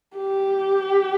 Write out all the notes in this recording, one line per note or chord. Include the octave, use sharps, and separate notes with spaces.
G4